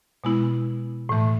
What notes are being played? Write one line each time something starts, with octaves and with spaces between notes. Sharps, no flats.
B2 G#3 B3 E4
A2 E3 A3